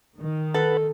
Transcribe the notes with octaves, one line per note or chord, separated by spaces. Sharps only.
D#3
A4 B4 F#5 A5